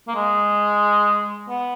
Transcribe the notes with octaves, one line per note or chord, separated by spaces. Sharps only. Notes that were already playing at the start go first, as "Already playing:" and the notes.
A#3
G#3
B3